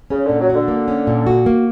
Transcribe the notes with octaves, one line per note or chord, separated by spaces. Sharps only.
C#3 C#4
A#2 D3
F#3
D3 F#4
A#3
C#4
A#2
F#4
A#3